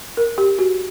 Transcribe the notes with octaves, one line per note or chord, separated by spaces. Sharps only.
A#4
G4
F#4